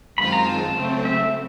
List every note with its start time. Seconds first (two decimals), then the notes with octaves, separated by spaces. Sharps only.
0.18 F#2 D#3 G#3 C4 F4 B5
0.32 A#5
0.47 A5
0.76 C#3 F#3 A3 C4
1.05 E5